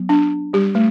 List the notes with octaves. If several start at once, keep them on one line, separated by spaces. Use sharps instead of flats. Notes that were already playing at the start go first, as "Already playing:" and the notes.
Already playing: F#3 B3
D4
G3 G4
A3